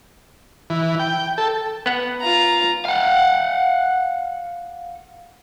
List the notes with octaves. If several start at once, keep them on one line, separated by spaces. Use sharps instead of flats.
E3
G5
A4
B3 F#5
F4 A#5
F5 F#5